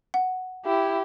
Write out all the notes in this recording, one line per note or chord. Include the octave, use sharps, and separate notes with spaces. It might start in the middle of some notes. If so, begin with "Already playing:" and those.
F#5
E4 G4